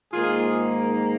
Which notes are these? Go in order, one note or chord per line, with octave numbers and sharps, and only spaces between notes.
G#2 D#3 A#3 F4 G#4